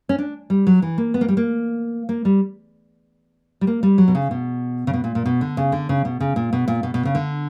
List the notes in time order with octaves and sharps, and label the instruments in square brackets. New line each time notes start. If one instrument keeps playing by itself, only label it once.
[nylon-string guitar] C#4
D4
G3
F#3
E3
A#3
B3
A#3
G3
A#3
A#3
G3
G3
A#3
G3
F#3
B2
C#3
B2
C#3
B2
A#2
A#2
B2
D3
C#3
D3
C#3
B2
C#3
A#2
B2
A#2
B2
B2
C#3
D3